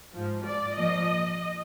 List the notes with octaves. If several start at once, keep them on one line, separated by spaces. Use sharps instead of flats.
G#2 F3
D5
A#2 F3 D#5